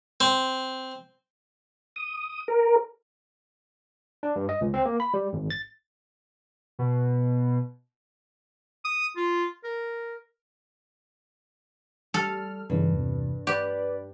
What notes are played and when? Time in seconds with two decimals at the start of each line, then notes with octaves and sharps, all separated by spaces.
0.21 C4
1.96 D#6
2.48 A#4
4.23 D4
4.36 G2
4.49 D#5
4.61 C#2
4.74 C4
4.85 A#3
5.00 B5
5.14 G3
5.33 G#1
5.50 A6
6.79 B2
8.85 D#6
9.16 F4
9.64 A#4
12.14 G3 A4 F6
12.70 G2 A#2 C#3 E3
12.93 E2 C3
13.47 G4 B4 D5